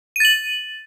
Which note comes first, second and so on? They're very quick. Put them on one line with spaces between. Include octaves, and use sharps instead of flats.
D#7 A6 F#7